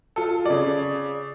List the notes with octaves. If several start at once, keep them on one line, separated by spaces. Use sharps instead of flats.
F4 A4
C#3 D5